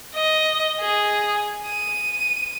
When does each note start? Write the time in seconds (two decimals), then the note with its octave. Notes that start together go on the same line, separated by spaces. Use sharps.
0.15 D#5
0.80 G#4
1.68 D#7